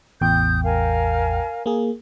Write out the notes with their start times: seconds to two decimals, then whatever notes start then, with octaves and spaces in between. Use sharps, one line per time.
0.21 A1 E2 G5 D#6 G6
0.64 A#4 F5 G#5
1.66 A#3 G#4